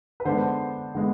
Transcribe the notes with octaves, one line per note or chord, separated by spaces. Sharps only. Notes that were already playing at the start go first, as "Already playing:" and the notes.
B4
D3 G#3 B3 D4 C5
D3 G#3 B3